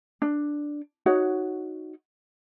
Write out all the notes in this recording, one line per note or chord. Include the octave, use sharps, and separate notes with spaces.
D4
D#4 F#4 C#5 F#5